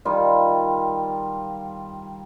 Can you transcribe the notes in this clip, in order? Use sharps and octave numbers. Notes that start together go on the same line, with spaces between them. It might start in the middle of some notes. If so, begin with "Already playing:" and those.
D#3 G3 F4